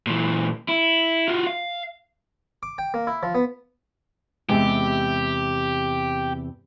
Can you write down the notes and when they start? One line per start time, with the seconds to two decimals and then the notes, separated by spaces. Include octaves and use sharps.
0.07 A#2 E3
0.69 E4
1.28 F4 F#4
1.47 F5
2.63 D6
2.78 G5
2.94 A#3
3.07 E4
3.23 F3
3.35 B3
4.49 E2 C3 G#3 G4